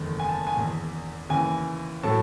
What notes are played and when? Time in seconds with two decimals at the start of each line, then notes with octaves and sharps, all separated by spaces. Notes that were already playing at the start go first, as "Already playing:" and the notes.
Already playing: F#1 E2 D#3 A3
0.19 G#5
0.29 A5
0.47 G#5
0.56 E1 E2 D#3
1.29 D#2 C#3 E3 G#5
2.03 A2 F#3 A3 A5